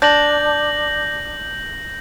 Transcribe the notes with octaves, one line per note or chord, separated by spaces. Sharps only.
D4 G6 A#6 F#7